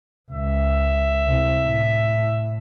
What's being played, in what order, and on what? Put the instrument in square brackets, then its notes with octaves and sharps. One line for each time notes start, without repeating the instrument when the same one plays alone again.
[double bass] C#2 [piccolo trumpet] E5
[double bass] C2
A2